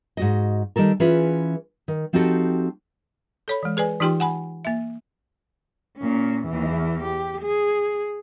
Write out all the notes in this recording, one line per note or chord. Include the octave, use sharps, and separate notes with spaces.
G#2 F#4 D#5
D#3 G3 A4 A#4
E3 C#4 F4 G#4 B4
D#3
F3 C4 D#4 F#4 G4 A4
A4 C#5 B5
E3 G#3
G#4 B4 D5 G#5
E3 D#4 F4 G4 G5 C6
F#5 G#5 B5
A#3 E5
A#2 C#4
E2 E3
G4
G#4